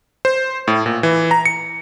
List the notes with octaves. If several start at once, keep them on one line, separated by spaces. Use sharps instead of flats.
C5
A2
A#2
E3
A#5
C#7